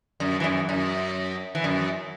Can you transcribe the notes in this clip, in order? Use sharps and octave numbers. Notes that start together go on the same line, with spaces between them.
F#2
E3
F#2
F#2
E3
F#2